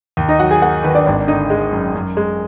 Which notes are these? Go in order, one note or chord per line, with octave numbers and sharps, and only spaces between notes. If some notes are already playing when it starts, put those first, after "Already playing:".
D#2
D#4 D#5
F#3 F#4 F#5
G#4 G#5
A#3 F#4 F#5
D#3 B4
D4 D5
G#1 D4 D5
D3 D#4 D#5
G#3
F#2
F#2
G#3